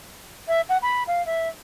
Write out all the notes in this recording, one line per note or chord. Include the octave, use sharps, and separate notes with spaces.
E5
F#5
B5
F5
E5